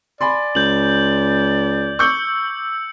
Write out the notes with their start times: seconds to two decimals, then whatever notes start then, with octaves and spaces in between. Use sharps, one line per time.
0.21 D5 G#5 B5 C6
0.55 C#2 G6 F#7
1.99 C#6 D6 E6 G6 C#7